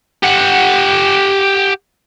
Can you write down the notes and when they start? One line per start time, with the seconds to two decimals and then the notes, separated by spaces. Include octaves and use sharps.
0.23 G4 F#5